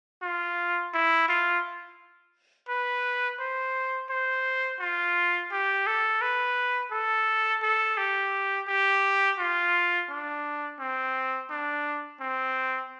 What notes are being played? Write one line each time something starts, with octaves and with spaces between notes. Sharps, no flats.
F4
E4
F4
B4
C5
C5
F4
G4
A4
B4
A4
A4
G4
G4
F4
D4
C4
D4
C4